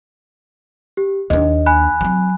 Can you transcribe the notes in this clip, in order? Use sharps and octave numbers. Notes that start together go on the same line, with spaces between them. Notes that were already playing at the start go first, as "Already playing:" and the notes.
G4
D#2 D4 D#5
G#5 B5 F#6
F#3 C4